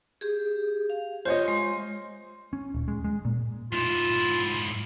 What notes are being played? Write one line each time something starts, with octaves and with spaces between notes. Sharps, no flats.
G4 G#4
F5
F4 C5 C#5 D#5
G#3 C6
C#4
D#1
G#3
G#3
A#2
G#2 E4 F4